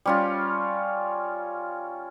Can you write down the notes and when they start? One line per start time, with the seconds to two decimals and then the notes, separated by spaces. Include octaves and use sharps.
0.06 G3 C#4 F4